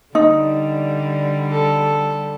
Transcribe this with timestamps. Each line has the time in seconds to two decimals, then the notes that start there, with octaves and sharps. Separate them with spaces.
0.15 D3 G3 D#4
1.51 A4